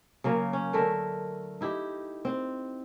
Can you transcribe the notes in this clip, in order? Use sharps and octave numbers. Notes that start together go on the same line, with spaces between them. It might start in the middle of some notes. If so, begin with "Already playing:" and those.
C#3 F#3 A#3
C#4
D3 A3 A#4 E5
D#4 E4 G4
C4